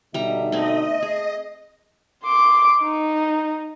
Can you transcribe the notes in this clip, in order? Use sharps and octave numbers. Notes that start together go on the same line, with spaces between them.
B2 D3 G3 D#4 E5 A#5
A3 C4 D#5
G#4
C6 D6
D#4